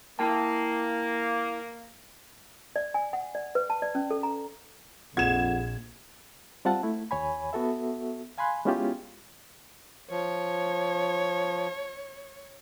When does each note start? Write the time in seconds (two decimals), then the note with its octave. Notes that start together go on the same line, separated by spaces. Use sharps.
0.19 A#3 E4 G5 A5
2.76 D5
2.94 G#5
3.13 F#5
3.35 D5
3.55 B4
3.70 A5
3.82 D5
3.95 C#4
4.11 A4
4.23 A#5
5.17 A#1 F2 G#4 F#5 G#6 E7
6.65 G3 C4 F4 F#5 A5
6.83 A3 E4
7.11 D#2 C#5 G#5 B5
7.53 B3 F#4 A4 E5
8.38 F5 G#5 B5 C6 F#6
8.65 G#3 B3 C#4 E4 F4 G4
10.11 F3 C#5